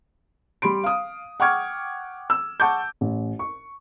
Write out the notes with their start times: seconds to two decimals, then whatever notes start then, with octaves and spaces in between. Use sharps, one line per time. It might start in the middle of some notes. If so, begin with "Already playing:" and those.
0.62 G3 B5 C6 D7
0.84 F5 D#6
1.40 F#5 G5 C#6 D6 F6 G#6
2.30 E6
2.60 F#5 A5 C#6 D6 G6
3.01 A1
3.39 C#6